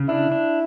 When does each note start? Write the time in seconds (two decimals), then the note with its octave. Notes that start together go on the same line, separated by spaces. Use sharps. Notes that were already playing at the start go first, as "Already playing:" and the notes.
Already playing: C#3
0.08 D4 E4
0.32 D4